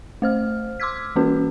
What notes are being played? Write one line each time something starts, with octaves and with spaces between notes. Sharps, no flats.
A3 C5 F6
C6 D6 E6 F6 G#6 B6
E3 A#3 C#4 F#4 B4